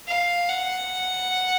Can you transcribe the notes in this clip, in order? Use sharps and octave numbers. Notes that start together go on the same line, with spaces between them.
F5
F#5